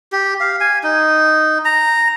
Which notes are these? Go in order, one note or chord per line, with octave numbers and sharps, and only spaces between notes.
G4
F5
G#5
D#4
A#5